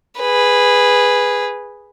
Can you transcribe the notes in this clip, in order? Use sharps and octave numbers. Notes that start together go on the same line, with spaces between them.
G#4 B4